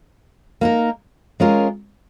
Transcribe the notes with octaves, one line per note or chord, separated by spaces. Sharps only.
A#3 D#4 A#4
G#3 C#4 F4 A#4